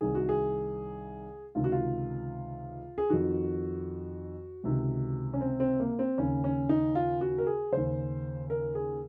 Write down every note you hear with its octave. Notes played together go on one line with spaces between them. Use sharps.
C2 C3 D#3 G#4
F#4
G#4
C#2 C3 D#3 F4
F#4
F4
G#4
F2 D#3 F#4
C#2 C3 D#3
C#4
C4
C4
A#3
C4
D#2 C#3 C#4
C#4
D#4
F4
F#4
A#4
G#4
D#2 C#3 C5
A#4
G#4